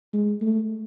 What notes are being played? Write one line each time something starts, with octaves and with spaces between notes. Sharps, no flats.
G#3
A3